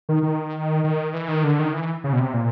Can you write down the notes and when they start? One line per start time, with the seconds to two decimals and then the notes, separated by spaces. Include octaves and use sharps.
0.09 D#3
0.23 D#3
0.84 D#3
1.14 E3
1.28 D#3
1.44 D3
1.59 D#3
1.73 E3
2.04 C#3
2.13 B2
2.19 C3
2.34 A#2